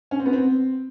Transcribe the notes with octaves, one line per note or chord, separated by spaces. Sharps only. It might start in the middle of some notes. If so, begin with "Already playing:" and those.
C#4
C4
B3
C4